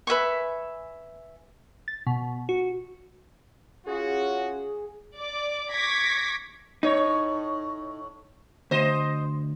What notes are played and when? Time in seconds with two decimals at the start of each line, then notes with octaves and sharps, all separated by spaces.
0.07 B4 E5 G#5 C#6
1.88 A6
2.07 B2
2.49 F#4
3.87 C#4 F4 F#4 G#4
5.16 D5 D6
5.70 C#6 D6 G#6 A#6 B6
6.83 A2 D#4 C#5
8.71 D2 C5 D#5